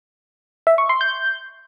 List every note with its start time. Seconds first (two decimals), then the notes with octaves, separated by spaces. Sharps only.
0.67 E5
0.78 C#6
0.89 C6
1.01 G6